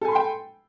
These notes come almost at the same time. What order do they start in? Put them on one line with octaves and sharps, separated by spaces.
A4 G#5 B5 C6 G5